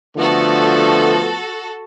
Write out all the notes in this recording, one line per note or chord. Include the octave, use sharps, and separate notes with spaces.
D3 F3 A3 B3 F#4 A4